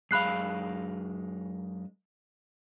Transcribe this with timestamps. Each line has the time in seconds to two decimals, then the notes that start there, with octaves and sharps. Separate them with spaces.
0.11 F#2 G#3 F5 B5 F#6 C7